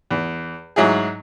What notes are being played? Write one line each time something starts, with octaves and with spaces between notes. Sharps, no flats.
E2
G#2 F#3 E4 G#4